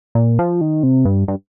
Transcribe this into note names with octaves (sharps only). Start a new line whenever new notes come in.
A#2
F3
D#3
C3
G2
G2